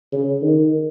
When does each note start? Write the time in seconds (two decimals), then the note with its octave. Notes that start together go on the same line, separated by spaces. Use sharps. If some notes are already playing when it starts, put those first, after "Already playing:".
0.12 C#3
0.42 D#3